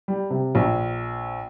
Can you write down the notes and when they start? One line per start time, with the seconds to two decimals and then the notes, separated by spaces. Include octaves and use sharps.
0.08 G3
0.30 C3
0.55 A#1